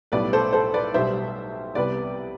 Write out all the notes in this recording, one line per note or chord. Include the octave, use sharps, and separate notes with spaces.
B1 A2 G3 B3 B4 D5
A4 C5
A4 C5
B4 D5
B1 B2 G3 C5 E5
C2 C3 G3 B3 B4 D5